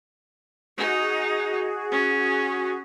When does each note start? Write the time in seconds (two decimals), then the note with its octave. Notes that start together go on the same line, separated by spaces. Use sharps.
0.77 D#4 F#4 G#4
1.91 C#4